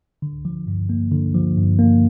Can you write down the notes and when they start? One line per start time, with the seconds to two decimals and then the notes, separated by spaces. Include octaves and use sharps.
0.22 D3
0.45 F3
0.67 G2
0.89 A#3
1.12 D3
1.35 F3
1.58 G2
1.79 A#3